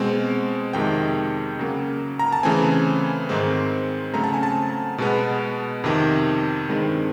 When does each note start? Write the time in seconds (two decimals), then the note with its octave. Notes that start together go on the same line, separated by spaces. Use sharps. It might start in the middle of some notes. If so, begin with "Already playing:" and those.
Already playing: B2 G#3 C4
0.73 F2 C3 D#3 G#3 G5
1.59 C#3 F#3 A#3
2.19 A#5
2.32 A5
2.43 C#3 E3 A3 C4 G#5
3.29 G#2 D#3 G#3 C4
4.13 C#3 F#3 A3 C4 A#5
4.24 A5
4.34 G#5
4.43 A5
4.98 B2 G#3 B3
5.84 F2 C3 D#3
6.69 G2 D#3 G#3 C4